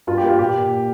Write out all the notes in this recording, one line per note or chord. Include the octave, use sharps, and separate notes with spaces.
G2 F4
G4
A#3
F4
A#2 G4
A#2